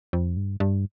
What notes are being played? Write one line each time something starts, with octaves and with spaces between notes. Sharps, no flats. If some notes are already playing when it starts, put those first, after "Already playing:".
F2
G2
G2